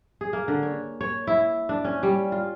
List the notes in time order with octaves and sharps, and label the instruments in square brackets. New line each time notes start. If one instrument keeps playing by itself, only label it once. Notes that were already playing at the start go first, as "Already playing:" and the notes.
[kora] G#4
A#3
D3
C#5
C#5
E4
D4
C#4
G3
F4